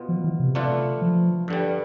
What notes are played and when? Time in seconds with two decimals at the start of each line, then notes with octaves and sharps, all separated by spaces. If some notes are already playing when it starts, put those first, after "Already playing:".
Already playing: B2 B3 F4
0.09 F3
0.24 E3
0.40 C3
0.55 D3 A3 D4 F4 B4
1.01 F3
1.48 G2 D3 G3